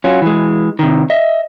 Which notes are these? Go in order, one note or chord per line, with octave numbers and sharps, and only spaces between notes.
F#3 C#4 F4
E3 G#3
C3 D#3
D#5 E5